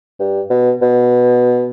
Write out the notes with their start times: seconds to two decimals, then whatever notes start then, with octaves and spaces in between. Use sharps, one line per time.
0.19 G2
0.50 B2
0.82 B2